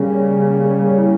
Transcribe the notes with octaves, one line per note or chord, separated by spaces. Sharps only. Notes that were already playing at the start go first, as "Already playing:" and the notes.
Already playing: C#3 G3 A#3 C#4 G#4
E4